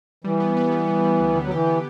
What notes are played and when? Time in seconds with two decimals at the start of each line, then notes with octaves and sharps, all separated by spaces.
0.24 E3 G3
0.40 B3
0.57 B3
0.71 G3
0.87 G3
1.03 G3
1.20 D2
1.35 D3
1.44 F#3
1.51 E3 G4
1.67 B3